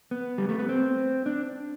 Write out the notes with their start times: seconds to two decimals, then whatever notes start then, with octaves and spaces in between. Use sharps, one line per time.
0.11 B3
0.38 G3
0.49 A3
0.59 B3
0.69 C4
1.26 D4